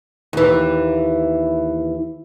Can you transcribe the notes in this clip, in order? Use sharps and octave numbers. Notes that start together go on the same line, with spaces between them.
D#2 E3